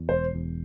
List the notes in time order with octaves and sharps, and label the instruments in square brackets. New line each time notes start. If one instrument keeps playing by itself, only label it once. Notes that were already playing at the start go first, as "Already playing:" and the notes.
Already playing: [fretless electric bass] E2
[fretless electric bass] E1 [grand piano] C5
[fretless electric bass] E2